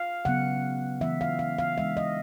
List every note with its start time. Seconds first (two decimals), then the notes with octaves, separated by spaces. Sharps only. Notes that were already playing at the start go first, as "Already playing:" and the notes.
Already playing: F5
0.25 C#3 F#3 B3 F#5
1.01 E3 G#3 B3 E5
1.21 F5
1.39 F5
1.58 F5
1.77 E3 G#3 B3 D4 E5
1.97 D#5